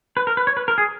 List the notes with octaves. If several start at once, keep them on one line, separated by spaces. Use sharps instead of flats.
B4
A#4
B4
C#5
B4
A#4
G#4